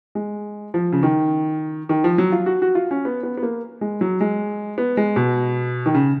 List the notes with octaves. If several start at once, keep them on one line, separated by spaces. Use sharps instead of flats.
G#3
F3
C#3
D#3
D#3
F3
F#3
F4
F#4
F#4
F4
C#4
B3
B3
B3
A#3
G#3
F#3
G#3
B3
G#3
B2
D#3
C#3